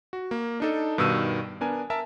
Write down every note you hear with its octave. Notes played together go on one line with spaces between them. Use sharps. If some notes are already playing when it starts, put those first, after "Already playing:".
F#4
A#3
D4 D#4 A4
G2 B2 D#3 E6 D#7
B3 D4 A#4 G#5
A#4 E5 A5